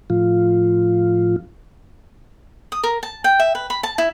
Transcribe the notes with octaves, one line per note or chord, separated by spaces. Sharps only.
A2 F3 F4
D#6
A#4
A5
G5
E5
B4
B5
A5
E4